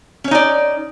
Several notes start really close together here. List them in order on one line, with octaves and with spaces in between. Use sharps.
C#4 C#5 D#4 D5